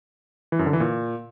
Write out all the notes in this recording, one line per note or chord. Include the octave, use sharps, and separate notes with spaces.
E3
F#2
D3
E3
A#2